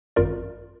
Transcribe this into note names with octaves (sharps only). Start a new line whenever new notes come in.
G#1 F#2 F4 A#4 D5